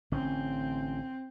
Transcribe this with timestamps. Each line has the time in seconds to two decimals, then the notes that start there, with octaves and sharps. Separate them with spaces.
0.12 A1 D3 C4 C#4